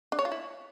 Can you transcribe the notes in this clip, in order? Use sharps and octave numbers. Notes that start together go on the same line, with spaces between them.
D4
C#5
F4
E4